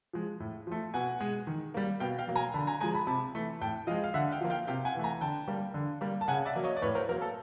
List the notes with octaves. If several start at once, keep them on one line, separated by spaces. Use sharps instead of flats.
F3 G#3
A2
F3 A3
B2 F#5 G#5
G#3
D#3
G3 A#3
B2 F5 G5
F5 G5
F#3 A#3
G#5 A#5
D3 A5 B5
G#5 A#5
F3 G#3 G#5 A#5
A5 B5
C3 A5 B5
E3 A3
A2 G5 A5
F3 G#3 D#5 F5
F5
D3 E5 F#5
F5 G5
F3 A#3
F5 G5
C3 F5 G5
F#5 G#5
E3 A3
G#5 A#5
D3 G5 A5
G3 A#3
D3
G3 A#3
A5
C#3 F#5 G#5
D5 E5
F#3 A#3
C#5 D#5
D5
A2 B4 C#5
A#4 C5
F#3 A#3 A#4
A4